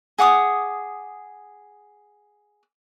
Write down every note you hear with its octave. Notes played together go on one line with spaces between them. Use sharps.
G#4 F#5 D6 D#6